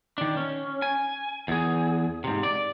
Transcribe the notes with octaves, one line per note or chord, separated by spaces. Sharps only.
D#3 D4
C#4
G#5
E2 G#4
G#2 C3
D5